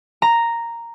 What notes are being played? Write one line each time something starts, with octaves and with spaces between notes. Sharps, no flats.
A#5